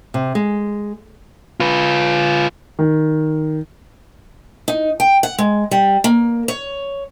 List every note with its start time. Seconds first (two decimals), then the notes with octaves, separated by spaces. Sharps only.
0.14 C3
0.35 G#3
1.60 F4 B4
2.79 D#3
4.68 D#4
5.00 G5
5.23 F#5
5.38 G#3
5.71 G3
6.04 A#3
6.48 C#5